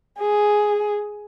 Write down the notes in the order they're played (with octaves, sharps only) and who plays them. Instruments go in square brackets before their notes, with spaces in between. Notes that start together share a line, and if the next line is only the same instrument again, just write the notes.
[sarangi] G#4